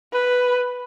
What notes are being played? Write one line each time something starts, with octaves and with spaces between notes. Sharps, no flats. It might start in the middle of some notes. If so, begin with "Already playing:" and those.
B4